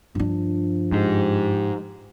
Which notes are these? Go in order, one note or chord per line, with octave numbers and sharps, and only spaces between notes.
G2 F3 D4
G#2 G4